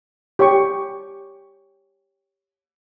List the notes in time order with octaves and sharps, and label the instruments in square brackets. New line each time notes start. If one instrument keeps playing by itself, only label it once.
[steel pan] G4 C#5 G5 C#6